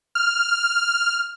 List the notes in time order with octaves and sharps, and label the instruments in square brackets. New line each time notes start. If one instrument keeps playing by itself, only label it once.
[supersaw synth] F6